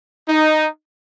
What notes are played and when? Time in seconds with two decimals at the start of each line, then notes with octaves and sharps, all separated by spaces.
0.29 D#4